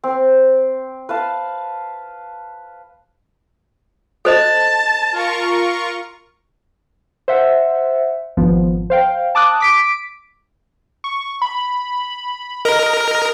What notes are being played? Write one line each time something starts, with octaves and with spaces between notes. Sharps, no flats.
C4
B4 F5 A5
A4 C5 D#5 A5
F4 A#4 C#6
C5 E5 F#5
G#1 F3 B3
C5 F5 G5
A5 D6 D#6 F#6
D6 B6 D7
C#6
B5
A#4 D#5